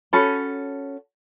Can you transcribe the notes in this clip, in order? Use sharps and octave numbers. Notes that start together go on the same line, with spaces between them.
C#4 F#4 A4 B5